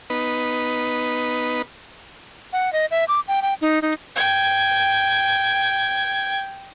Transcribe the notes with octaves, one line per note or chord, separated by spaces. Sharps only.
B3 D#4 B4
F#5
D#5
E5
D6
G5
G5
D#4
D#4
G5 G#6